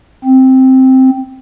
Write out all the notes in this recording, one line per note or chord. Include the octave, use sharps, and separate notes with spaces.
C4